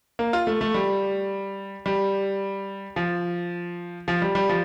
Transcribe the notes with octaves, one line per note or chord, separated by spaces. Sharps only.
A#3
F4
A3
A3
G3
G3
F3
F3
G3
G3
F3